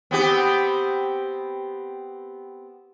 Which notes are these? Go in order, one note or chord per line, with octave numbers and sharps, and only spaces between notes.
B3 C4 G4